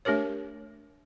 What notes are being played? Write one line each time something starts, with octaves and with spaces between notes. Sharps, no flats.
A3 D4 G4 A#4 C#5